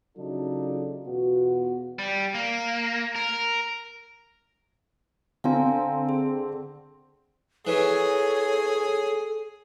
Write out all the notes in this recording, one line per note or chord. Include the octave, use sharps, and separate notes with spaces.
C#3 F#3 D4 D#4 F4 A4
E2 B2 B3 F4 F#4
G3
A#3
A#4
D3 C4 F5 G#5 A#5
G#4
E3 G#4 A4 C#5